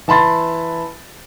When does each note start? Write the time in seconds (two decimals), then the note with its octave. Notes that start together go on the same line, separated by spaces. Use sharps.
0.08 E3 A5 B5 C6 A6